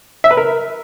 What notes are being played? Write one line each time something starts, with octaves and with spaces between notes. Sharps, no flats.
E5
B4
A#4